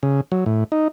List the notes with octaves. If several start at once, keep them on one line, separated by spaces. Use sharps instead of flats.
C#3
F#3
A2
D#4